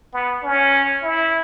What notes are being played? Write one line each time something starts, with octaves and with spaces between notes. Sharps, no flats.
B3
C#4
E4